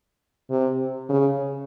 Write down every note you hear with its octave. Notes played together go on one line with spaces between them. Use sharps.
C3
C#3